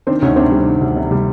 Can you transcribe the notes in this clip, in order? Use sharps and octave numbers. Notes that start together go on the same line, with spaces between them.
D#3 C4 D4
D2 C#4 D#4
C3 C4 D4
G3
D#3
D2
C3
G3